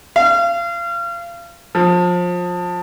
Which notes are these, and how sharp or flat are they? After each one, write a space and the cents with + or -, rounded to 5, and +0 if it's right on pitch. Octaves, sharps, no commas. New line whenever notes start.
F5 -35
F3 +25